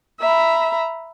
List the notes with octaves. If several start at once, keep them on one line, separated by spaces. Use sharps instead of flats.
E5 A#5 B5